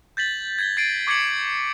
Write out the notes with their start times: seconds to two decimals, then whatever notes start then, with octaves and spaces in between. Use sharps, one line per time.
0.17 G6 A6 B6 F#7
0.59 G#6 B6 G7
0.76 G#6 A6 C7 D7 D#7
1.07 C#6 D6 G#6 A6 C#7 F#7